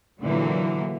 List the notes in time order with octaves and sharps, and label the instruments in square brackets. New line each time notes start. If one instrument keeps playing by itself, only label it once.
[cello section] A#2 D3 E3 F#3 A#3